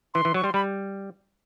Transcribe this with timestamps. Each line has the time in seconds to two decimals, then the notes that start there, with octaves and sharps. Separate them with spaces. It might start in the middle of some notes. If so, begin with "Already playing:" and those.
0.14 E3 C6
0.25 E3
0.34 F#3 C#6
0.44 G3 C6
0.54 G3 B5